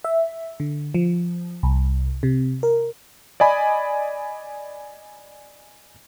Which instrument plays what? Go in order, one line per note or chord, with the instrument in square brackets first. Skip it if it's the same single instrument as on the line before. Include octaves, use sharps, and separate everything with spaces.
[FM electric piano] E5
D3
F3
C2
C3
A#4
[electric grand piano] D5 D#5 G#5 B5